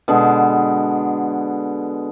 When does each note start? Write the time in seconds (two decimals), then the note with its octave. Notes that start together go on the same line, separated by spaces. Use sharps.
0.08 B2 D3 G#3